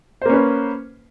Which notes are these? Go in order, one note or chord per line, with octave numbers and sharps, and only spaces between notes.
A#3 C#4 B4 C5